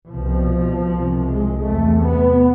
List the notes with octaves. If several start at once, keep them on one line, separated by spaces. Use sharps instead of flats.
C2 B2 F3
C2 C3
G#3
E2 C3 A3
B3